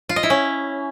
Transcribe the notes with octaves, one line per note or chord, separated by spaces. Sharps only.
F4
D#5
E4
C#4